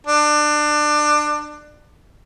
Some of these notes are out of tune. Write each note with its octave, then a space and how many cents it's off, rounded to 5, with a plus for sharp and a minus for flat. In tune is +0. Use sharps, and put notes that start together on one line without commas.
D4 +25